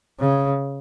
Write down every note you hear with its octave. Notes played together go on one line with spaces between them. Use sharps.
C#3